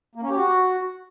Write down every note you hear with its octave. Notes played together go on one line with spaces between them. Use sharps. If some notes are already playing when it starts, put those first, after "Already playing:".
A#3
C#4
G4
F#4